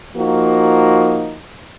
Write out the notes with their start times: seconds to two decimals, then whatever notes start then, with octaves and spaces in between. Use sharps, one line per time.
0.17 F3 A#3 D#4 F#4